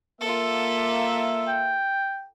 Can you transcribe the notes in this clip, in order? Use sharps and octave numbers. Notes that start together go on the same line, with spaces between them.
A#3 F4 A4 E5
G5